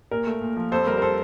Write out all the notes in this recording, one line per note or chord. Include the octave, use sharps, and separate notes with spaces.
A#2 A#4
A3
A#2
F3
F2 A4 C5
G3 A#4
A#4
A4 C5